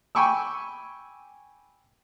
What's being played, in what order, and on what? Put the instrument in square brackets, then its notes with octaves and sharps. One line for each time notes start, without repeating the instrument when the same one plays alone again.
[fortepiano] G5 G#5 B5 C#6 D6 E6